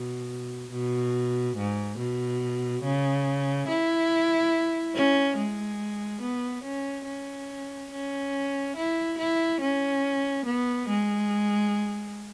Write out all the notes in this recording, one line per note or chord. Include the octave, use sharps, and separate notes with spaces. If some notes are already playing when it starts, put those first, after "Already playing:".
Already playing: B2
B2
G#2
B2
C#3
E4
C#4
G#3
B3
C#4
C#4
C#4
E4
E4
C#4
B3
G#3